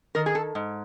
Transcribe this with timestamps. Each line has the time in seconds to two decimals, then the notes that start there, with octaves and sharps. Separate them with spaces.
0.15 D#3 A#4
0.26 G#4
0.35 A4
0.55 G#2